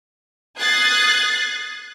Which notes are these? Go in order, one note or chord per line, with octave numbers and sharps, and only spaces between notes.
D#6 F#6 G#6 A6 C7